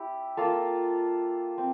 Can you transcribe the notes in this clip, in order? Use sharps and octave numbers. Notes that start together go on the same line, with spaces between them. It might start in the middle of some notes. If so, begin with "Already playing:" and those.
Already playing: E4 G4
A#3 F4 A4
C4